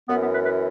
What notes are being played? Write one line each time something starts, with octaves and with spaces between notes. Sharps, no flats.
F#2 B3
E3
B3
B4
B4